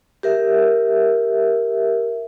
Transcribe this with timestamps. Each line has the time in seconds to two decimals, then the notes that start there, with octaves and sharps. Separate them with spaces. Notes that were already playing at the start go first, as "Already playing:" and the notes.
0.23 G4 A#4 E5